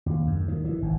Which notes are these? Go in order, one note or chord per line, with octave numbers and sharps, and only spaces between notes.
D#2
F#2
D#3
E3
G#1